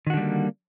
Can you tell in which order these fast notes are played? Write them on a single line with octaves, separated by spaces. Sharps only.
D#3 F#4 D3 G3 A#3